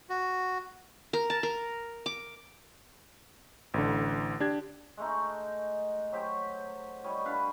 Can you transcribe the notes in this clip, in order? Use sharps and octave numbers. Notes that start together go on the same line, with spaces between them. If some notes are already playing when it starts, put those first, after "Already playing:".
F#4
A#4
A5
A#4
D6
A1 D3
D4 G4 G#6
G#3 A3 D#4
F#3 G4 C5
G3 C#5 D#5
D4 B4 F5